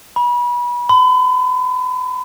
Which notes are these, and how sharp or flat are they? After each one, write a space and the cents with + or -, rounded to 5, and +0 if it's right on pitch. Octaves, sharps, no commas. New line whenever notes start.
B5 -30
B5 +40